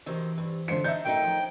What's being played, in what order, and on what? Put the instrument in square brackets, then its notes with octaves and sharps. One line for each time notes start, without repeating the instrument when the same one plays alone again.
[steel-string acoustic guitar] D2 D#3 C5 [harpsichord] C3 E3
[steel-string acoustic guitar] G2
[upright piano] D3 C5 C#7 [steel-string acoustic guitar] F4 E5
[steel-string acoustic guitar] D4 D#4 [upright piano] E5 G6
[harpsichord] F#2 [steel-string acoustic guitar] D#3 A3 D#4 [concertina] G5
[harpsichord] F3 C#4